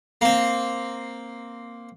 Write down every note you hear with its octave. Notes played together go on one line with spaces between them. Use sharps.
A#3 C4